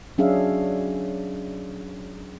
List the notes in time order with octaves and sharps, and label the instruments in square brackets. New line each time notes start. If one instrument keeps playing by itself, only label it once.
[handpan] F#3 C#4 D4 G#4 E5 F5